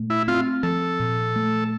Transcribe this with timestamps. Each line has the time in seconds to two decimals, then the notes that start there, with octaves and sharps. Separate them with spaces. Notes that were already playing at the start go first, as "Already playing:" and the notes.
Already playing: A#2 A3
0.10 E4
0.28 C4 F4
0.63 F3 A4
1.00 A#2
1.36 A3